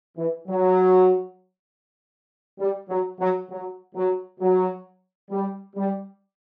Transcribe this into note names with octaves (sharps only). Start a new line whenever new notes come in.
E3
F#3
G3
F#3
F#3
F#3
F#3
F#3
G3
G3